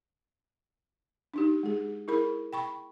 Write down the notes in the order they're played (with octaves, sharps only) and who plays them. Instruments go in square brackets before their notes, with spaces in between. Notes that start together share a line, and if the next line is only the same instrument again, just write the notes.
[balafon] D4 D#4 G4
G#3 G#4
E4 G#4 A#4 B5
G5 B5 C#6